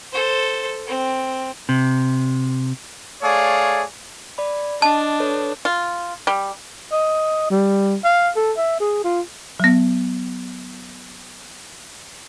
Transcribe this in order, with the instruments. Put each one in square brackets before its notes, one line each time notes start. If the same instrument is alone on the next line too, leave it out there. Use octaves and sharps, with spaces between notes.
[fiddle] A4 C5
C4
[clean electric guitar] C3
[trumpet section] A3 G#4 C#5 D5 F5
[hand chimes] D5 B5
[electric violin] D4 [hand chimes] D#5 [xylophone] A5
[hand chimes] A4 B4 C#5
[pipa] F4
G3
[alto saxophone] D#5
G3
F5
A4
E5
G#4
F4
[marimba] F#3 B3